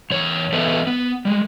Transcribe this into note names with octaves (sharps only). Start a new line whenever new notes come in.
E2 C#5
E3 B3 A4 B4 D#5 E5
B3
G3 G#3